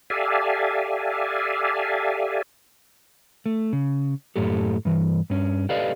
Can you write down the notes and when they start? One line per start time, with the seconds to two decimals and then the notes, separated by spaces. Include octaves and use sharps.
0.10 G4 A4 D5 E5 F5 G#5
3.46 A3
3.73 C#3
4.36 F#2 A2 G4 A4
4.85 G2 E3
5.30 G2 C#4
5.69 G4 A4 B4 D5 D#5 F5